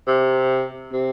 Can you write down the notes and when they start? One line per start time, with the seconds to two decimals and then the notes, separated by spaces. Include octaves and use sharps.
0.07 C3
0.92 C3